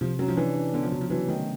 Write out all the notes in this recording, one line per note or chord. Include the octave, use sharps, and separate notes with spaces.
C3 F3
F#3 C#4
F3
E3 D4
D4
D3 B3
F3
C#3 F#3
F3
E3 F#3
D#3 A3